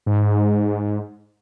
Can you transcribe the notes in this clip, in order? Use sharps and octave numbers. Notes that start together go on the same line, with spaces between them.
G#2